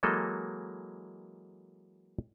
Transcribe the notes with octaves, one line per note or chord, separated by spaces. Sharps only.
E3 F#3 G#3 A#3 A4 D#5